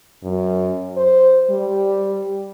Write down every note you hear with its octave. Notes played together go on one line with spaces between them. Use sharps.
F#2
C5
G3